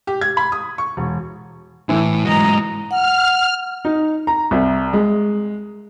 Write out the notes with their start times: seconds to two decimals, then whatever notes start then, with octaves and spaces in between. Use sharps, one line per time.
0.07 G4
0.21 G#6
0.37 B5
0.52 D#6
0.78 C#6
0.97 E1
1.89 A2 E3 E4
2.25 G#2 F#3 D#5 A#5
2.91 F#5 F6
3.85 D#4
4.27 A#5
4.51 C2
4.93 G#3